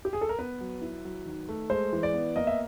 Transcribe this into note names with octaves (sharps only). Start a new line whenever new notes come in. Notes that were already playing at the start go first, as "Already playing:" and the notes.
G4
G#4
A4
A#4
B3 B4
F#3
E4
F#3
D#3
A3
G#3 C5
E3
D5
B3
A#3 D#5
E5